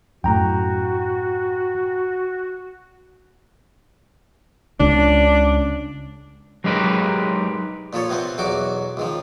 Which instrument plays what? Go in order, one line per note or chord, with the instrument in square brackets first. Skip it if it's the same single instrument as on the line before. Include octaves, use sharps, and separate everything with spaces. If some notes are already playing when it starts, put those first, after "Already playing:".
[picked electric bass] F#2 A2 [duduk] F#4 [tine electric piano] G5 A#5
[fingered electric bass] C#2 C#3 [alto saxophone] D4
[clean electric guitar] F#3 G#3 D#4 G4 A#4 B4
[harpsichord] A#2 F3 A4 C#5
C3 B3 C4 F4
B1 E2 F#3 F#4 D6
C#2 D#3 F3